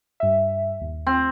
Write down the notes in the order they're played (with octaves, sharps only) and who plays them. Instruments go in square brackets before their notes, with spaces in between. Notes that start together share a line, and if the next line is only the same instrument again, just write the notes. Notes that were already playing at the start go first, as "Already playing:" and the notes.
[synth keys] G2 E5
D#2
[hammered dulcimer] C4